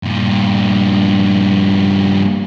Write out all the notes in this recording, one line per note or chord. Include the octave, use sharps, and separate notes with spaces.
G2 A#2